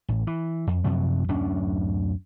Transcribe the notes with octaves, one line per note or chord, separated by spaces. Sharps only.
A1
E3
F2
F#2 C3 F3 F#3
D1 F#2 C#4 D4